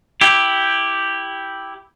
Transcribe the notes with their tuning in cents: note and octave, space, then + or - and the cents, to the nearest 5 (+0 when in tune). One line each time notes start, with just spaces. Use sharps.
E4 -5 G4 +0